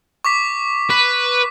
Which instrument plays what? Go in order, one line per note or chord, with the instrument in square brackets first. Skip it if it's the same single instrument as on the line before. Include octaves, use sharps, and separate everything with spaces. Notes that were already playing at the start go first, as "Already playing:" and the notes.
[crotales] C#6 D6 B6
[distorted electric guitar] B4 [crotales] B6